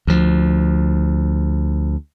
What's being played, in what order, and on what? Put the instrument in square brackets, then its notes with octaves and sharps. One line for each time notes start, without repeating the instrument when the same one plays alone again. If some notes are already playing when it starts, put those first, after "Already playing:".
[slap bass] D2 F3